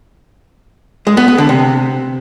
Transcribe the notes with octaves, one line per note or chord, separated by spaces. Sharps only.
G#3
B3
B3
D3
C3